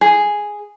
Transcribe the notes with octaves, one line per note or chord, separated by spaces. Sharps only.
G#4